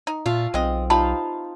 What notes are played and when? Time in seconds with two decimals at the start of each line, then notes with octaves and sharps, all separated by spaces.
0.07 D#4
0.26 A#2 A3 F4 F5
0.54 B1 G#3 C4 D#5
0.90 E3 D#4 F4 G4 C5 A5 B5